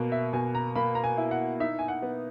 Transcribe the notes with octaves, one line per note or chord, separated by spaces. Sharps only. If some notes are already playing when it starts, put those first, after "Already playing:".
Already playing: B2 A#3
E5
B2 G#5
A#5
A#3 B5
A#5
G#5
E4
F#5
D#4 E5
G#5
F#5
B3